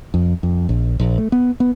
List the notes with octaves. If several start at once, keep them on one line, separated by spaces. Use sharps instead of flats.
F2
F2
A#1
A#1
A3
B3
B3